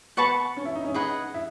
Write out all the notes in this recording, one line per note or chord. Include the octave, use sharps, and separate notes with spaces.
B3 B4 F#5 A5 C#6
C#4
E4
D#4
C#4
D#4 G#4 B4 D#5 F#5
E4